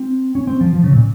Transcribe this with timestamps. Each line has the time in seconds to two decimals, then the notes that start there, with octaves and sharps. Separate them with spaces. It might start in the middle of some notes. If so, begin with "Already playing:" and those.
Already playing: C4
0.35 C#4
0.47 C4
0.61 F3
0.73 F3
0.84 C#3
0.93 A#2